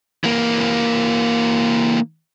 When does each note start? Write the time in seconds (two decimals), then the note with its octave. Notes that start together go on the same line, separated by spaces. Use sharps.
0.24 E3 A#3